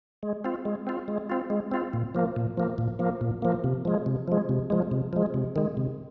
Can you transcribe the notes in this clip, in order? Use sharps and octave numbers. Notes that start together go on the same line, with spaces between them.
G#3
C4 F4
G#3
C4 F4
G#3
C4 F4
G#3
C4 F4
A#2
F3 A#3
A#2
F3 A#3
A#2
F3 A#3
A#2
F3 A#3
C3
F3 G#3
C3
F3 G#3
C3
F3 G#3
C3
F3 G#3
C3
D#3 G#3
C3